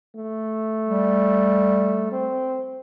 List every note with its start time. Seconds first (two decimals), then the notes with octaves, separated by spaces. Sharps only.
0.16 A3
0.88 G3
2.12 C4